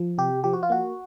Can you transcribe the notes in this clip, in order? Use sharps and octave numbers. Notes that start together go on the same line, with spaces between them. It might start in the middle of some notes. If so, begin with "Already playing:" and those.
Already playing: F3
C3 G4
F3 G4
F#4
F4
A#3 F#4